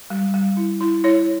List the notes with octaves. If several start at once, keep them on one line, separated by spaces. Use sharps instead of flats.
G3
G3
E4
E4
E4 C#5